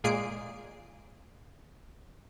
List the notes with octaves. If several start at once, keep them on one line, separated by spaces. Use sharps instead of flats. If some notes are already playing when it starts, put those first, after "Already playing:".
A#2 G#3 A#3 G#4 C7 D7